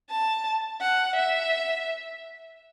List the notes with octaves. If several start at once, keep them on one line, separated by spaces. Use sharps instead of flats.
A5
F#5
E5